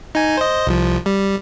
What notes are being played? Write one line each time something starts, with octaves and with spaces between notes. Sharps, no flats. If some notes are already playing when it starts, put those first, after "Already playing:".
D#4 G#5
C5 D#5
C2 F3
G3